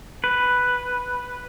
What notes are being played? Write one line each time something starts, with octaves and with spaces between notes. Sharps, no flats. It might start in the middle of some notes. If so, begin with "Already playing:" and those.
B4